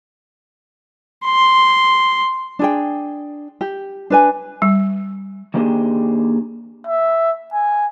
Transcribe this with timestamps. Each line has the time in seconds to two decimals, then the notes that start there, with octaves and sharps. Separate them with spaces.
1.25 C6
2.59 D4 G#4 G5
3.61 G4
4.10 D4 B4 G#5
4.62 G3
5.54 D#3 A#3 D4 G4 G#4
6.87 E5
7.53 G#5